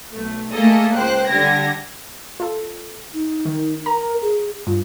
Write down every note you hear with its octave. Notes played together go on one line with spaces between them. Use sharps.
B1 A3
A3 A#3 G#4 A4 D#5
C#2 C5 G5 F#6
D3 G3 G4 G#6 A#6
F4 A4
D#4
D#3
A#4 A#5
G#4
G2 F4